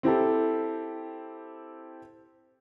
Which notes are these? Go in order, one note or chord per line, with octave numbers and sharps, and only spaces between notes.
C4 E4 G4 A4